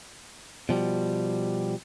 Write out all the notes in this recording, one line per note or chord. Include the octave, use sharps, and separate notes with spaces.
B2 F3 G3